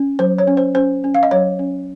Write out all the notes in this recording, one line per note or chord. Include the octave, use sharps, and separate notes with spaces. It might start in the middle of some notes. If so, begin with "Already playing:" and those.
Already playing: C#4
F#3 C5
C#5
C#4
C5
C#4 C5
C#4
F5
D#5
F#3 C#5
C#4